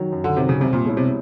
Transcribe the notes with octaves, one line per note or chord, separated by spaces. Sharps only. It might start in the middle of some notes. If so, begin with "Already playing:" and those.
Already playing: D#3 F#3
F#2
D3
C3 D#3 F#3
C#3
C2 C3
A#2
B2 G#3 C#4 E4
C3